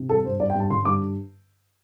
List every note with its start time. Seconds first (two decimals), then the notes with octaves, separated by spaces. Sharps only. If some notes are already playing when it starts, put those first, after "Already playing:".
Already playing: C3
0.09 G3 A4
0.25 G2 C5
0.39 G2 D5
0.50 G5
0.55 G2 A5
0.70 D3 C6
0.85 G2 D6